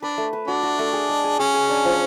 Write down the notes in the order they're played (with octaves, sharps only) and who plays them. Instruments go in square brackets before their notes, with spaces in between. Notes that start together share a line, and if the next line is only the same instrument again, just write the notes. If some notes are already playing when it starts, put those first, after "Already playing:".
[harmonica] D4 [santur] B4
[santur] A3
B4
[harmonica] D4 [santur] F#4
[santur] F#4
A3
G#4
G#3
G#4
[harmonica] C#4 [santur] G#4
[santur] G#4
D4
F3